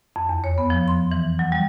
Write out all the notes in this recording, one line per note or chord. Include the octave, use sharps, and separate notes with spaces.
F2
E2
C#5
B3
F3
C6
E3
F#3
G3